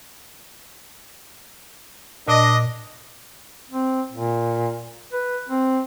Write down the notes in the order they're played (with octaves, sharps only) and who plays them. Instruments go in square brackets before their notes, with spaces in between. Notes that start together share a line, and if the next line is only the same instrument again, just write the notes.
[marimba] A#2 [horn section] D4 D#5
[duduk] C4
A#2
B4
C4